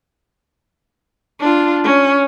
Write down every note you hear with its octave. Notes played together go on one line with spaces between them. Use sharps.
D4 F4
C#4